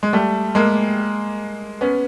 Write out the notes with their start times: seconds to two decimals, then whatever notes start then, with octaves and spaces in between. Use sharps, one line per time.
0.03 G#3
0.13 G3 A3
0.55 G#3 A#3
1.81 B3 C#4